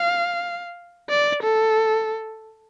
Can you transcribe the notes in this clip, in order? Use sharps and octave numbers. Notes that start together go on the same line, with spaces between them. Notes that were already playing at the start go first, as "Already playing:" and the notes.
Already playing: F5
D5
A4